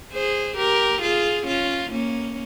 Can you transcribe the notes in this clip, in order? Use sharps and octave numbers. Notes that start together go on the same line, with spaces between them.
G#4 C5
G4 A#4
F4 G#4
C#4 F4
A#3 C#4